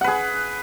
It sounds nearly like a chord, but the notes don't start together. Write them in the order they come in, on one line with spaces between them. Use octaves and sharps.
F#5 B4 G#4